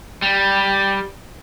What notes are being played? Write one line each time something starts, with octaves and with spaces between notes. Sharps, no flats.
G3